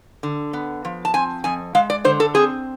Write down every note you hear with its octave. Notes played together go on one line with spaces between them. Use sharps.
D3
B3
F3
A5
C4 G#5
F2 G#5
G#3 F5
D5
D3 C5
A4
C4 G#4